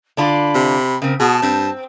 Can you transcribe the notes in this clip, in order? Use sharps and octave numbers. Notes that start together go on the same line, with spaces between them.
D3 D4 F4 B5
C3
C#3 C4 A#4
B2 F#4 G#4 A5
G2 C4